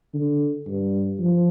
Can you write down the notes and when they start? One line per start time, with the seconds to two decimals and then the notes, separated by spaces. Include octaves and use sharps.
0.14 D3
0.68 G2
1.20 F3